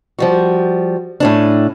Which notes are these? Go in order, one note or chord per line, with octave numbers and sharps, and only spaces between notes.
F3 G3 F#4
A2 C#4 D4